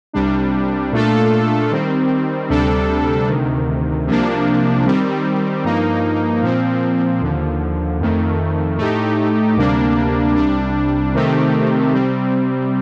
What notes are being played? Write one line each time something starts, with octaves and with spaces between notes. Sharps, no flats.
C2 C3 G3 D4
A#2 A3 D4 F4 A4
D#3 G3 C4
D2 C3 G3 D4 A4
D2 C3 D#3
C2 C3 F3 A#3 D4
D#3 G3 C4
G2 F3 A#3 D#4
A#2 F3 C4
D#2 D3 F3
F2 D#3 A3
A2 A3 D#4 G4
D2 C3 G3 A#3 D4
C2 C3 G3 D4
C3 D#3 A3 C4 G4
C3 G3 C4